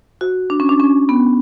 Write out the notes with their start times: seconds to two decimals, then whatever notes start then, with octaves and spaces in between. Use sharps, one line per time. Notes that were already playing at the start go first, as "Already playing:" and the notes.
0.21 F#4
0.50 D4
0.60 C#4
0.69 D4
0.80 C#4
1.09 B3